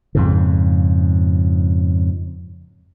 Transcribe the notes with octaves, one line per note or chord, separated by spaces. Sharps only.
F2 G#2 C#3